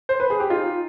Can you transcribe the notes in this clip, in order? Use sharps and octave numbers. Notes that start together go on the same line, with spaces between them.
C5
B4
G#4
G4
D#4 F4